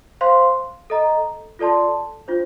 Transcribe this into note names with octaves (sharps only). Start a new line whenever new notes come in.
C5 F5 C6
A4 D#5 A#5
F4 A4 D5 A5 C6
D4 F4 C5